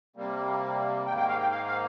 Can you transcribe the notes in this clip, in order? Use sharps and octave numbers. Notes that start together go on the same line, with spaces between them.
C3 G3 A#3
G#2 D#3 A#3 G5
G5
F5
G5
F5
F5